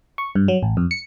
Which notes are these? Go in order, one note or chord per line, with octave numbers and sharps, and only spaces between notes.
C#6
G2
F#3
A1
F2
C#7